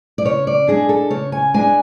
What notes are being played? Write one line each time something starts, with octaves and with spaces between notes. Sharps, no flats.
D5
C#3 C#5
D5
G#3 D4 G#4
A4
C#3 C#5
G#5
G#3 D4 G#5